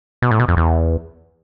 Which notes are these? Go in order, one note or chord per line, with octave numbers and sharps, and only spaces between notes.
B2
A2
B2
F2
E2